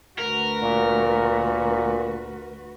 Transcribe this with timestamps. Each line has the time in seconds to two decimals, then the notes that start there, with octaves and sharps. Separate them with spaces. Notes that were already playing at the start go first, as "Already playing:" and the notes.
0.19 D2 F#4 A#4 B4
0.63 A#2